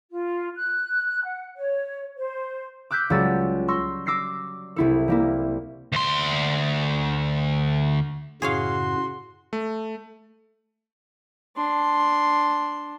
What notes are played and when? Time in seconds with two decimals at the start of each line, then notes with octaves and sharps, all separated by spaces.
0.10 F4
0.55 F#6
1.24 F#5
1.56 C#5
2.17 C5
2.91 D6 E6 F#6 G6 B6
3.10 C#2 F#3 G3 F#4 E6 A6
3.68 C6 C#6 E6 A#6
4.06 D6 E6 A#6 C7 C#7
4.76 C2 E4 A4
5.08 G3 A#3 E4
5.93 D2 C6
8.42 F#2 A2 C#3 F#4 G#4 C#5 F5 C6
9.53 A3
11.57 D4 C6